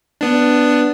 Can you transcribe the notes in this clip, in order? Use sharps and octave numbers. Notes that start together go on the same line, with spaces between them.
B3 D4